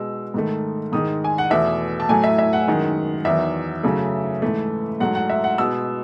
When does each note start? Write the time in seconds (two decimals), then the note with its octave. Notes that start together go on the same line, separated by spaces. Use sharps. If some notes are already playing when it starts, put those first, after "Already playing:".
Already playing: B2 G#3 E6
0.34 G#2 D#3 A3
0.92 G#2 D#3 G#3 D#6
1.24 G#5
1.38 F#5
1.50 E2 B2 A3 E5
2.00 A5
2.09 A2 F#3 A3 G#5
2.24 E5
2.38 E5
2.53 F#5
2.67 F#2 D#3 G#3
3.25 E2 D#3 F#3 E5
3.83 F#2 C#3 F#3 A3
4.42 G#2 E3 A3
5.00 G#2 F#3 A3 F#5
5.15 F#5
5.30 E5
5.44 F#5
5.58 B2 G#3 E6